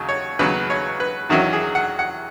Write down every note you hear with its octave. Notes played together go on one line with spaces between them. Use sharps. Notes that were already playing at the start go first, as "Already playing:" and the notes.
Already playing: D#2 C#3 F#3
C#5
D#2 C#3 F#3 B3 B4
C#5
B4
E2 D#3 F#3 C#4 E4 F#4
G#4
F#5
F#5